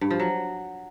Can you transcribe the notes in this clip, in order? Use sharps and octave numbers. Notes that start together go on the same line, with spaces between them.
G2
F3
F#3